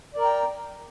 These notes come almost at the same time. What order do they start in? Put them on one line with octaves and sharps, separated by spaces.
D5 A#4 A#5 G5